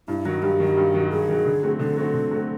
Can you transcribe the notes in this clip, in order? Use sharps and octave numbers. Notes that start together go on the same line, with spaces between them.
G2 E4
D#3 F#3 F#4
G2 G4
D#3 F#3
G2
D#3 F#3
G2 G#4
D#3 F#3
D3
F#3 A3 C4
D3 A4
F#3 A3 C4
D3
F#3 A3 C4